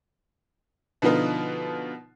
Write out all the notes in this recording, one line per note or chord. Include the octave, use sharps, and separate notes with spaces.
B2 D3 F3 B3 D#4 F4